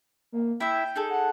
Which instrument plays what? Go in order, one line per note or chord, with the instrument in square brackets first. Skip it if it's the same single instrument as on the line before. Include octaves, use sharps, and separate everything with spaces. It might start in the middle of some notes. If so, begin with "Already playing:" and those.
[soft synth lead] A#3
[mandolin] E4 E5 [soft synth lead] G5
[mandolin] D#4 G#4 A4
[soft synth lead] F#5